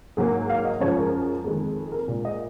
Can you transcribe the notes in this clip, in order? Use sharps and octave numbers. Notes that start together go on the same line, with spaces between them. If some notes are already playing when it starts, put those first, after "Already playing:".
G#2 F#3 A#3 G#4
F5
D#5
F#2 F3 G#3 C#5
A#4
F2 D#3 G#3
A#4
A#2 G#3
D#5